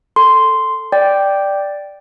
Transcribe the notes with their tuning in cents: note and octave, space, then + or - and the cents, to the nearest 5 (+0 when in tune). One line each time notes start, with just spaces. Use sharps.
A4 +10 C6 -5
D5 +0 G5 +0